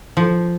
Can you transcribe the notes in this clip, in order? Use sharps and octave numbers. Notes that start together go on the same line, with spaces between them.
F3